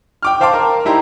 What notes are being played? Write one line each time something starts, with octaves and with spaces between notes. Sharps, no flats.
G5 D6 F6
C5 F5 A5 C6 D6
A#4
D#4 E4 G4 A#5 C6